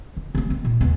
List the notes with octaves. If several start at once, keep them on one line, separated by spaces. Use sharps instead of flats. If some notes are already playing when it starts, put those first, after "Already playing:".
D#3
D3 A#3
D#3
A#2
D#2 B3